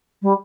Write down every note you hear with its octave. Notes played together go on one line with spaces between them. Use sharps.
G3